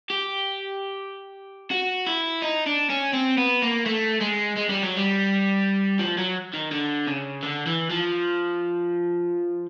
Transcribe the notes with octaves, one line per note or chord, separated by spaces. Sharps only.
G4
F#4
E4
D#4
D4
C#4
C4
B3
A#3
A3
G#3
G#3
G3
F#3
G3
F3
F#3
D#3
D3
C#3
D3
E3
F3